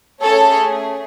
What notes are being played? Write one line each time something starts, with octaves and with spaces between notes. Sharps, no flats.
A3 C#4 G#4 A4 C#5